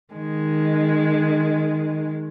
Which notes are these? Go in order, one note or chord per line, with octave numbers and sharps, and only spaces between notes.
D#3 G#3